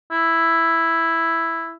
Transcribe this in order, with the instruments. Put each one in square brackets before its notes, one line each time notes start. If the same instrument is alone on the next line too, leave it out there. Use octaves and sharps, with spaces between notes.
[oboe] E4